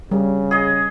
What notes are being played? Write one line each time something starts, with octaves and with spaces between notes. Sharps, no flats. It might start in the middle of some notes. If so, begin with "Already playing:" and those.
C#3 G3
G#4 D#5